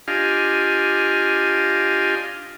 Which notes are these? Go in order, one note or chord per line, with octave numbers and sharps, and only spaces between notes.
D4 F4 G4 D#5 F5 G#5